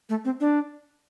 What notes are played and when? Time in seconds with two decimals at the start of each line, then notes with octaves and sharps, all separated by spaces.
0.09 A3
0.25 C4
0.40 D4